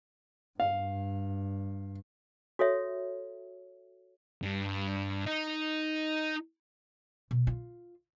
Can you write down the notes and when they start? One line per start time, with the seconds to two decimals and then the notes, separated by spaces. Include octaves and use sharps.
0.60 G2 F5
2.59 F#4 A4 C#5 E5
4.42 G2
5.26 D#4
7.31 B2
7.47 F4